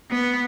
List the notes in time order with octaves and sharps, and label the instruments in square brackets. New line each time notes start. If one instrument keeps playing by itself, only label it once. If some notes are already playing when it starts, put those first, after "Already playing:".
[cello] B3